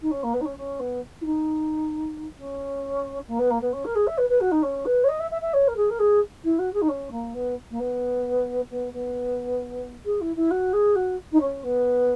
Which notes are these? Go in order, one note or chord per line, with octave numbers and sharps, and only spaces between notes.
D#4
C#4
A#3
B3
D#4
C#4
C#4
B3
E4
D#4
C#4
A#3
B3
A#3
B3
C#4
A#4
G#4
E5
B4
B4
F#4
D#4
C#4
B4
C#5
D#5
E5
E5
E5
C#5
A#4
G#4
A#4
G#4
E4
F#4
G#4
D#4
C#4
A#3
B3
A#3
B3
B3
B3
G#4
E4
E4
F#4
G#4
F#4
D#4
C#4
B3